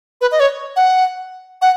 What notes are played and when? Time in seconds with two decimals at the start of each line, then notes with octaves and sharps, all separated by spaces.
0.21 B4
0.32 D#5
0.40 C#5
0.76 F#5
1.62 F#5